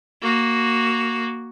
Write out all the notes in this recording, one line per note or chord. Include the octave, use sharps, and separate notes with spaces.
A#3 F#4